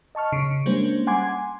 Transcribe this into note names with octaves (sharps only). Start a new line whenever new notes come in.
D#5 A5 C#6 F6
C#3 C#4
G3 G#3 A#3 C#4 D4 C5
F#5 G#5 C6 D6 G#6
G#5